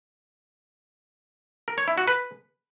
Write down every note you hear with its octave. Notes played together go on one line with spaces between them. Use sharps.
A#4
C#5
E4
F#4
B4